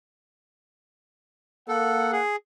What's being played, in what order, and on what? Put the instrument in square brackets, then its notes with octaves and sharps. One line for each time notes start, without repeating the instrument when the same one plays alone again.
[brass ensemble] A#3 F#5 [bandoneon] A4
[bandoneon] G#4